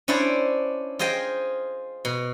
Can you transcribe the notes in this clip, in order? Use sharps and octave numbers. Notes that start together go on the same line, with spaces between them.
C#4 D4 E4 C5 D5
F4 G#4 C5 D#5 G5
B2